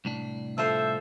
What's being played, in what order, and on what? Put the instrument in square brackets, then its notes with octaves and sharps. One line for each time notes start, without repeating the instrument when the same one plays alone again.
[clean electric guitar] C2 A2 D4
[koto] F3 A4 C5 [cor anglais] E5